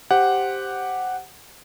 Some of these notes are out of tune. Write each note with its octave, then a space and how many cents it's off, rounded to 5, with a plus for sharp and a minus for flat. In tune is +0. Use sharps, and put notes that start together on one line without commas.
G4 +0 C5 +0 F#5 +0